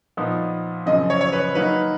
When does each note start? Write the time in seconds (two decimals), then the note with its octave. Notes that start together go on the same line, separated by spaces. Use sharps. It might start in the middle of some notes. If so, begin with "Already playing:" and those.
0.17 A#2 F3 B3 D#4
0.86 F#2 C#3 F3 D#5
1.10 C#5
1.21 C#5
1.33 B4
1.55 D#3 F#3 A#3 D#4 B4